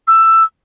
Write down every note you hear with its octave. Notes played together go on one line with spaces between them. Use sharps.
E6